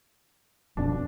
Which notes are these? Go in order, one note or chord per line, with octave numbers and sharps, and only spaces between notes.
D#1 F2 B2 D4